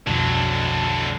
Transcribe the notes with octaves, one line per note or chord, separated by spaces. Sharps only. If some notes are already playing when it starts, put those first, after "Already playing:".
B1 F2 D3 F#3